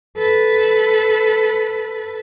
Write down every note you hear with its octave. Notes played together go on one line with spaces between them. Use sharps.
A4 B4